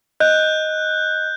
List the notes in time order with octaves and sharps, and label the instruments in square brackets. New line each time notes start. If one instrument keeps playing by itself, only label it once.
[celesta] D#5 [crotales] F#6 G6